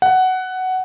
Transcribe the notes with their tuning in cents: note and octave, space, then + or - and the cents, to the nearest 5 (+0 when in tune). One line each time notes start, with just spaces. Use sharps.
F#5 +10